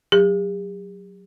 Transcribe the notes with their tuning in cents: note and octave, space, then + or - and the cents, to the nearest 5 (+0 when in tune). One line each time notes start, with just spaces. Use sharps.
F#3 +0 G4 +45